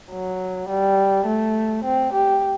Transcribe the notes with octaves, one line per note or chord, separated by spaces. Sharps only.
F#3
G3
A3
C4
G4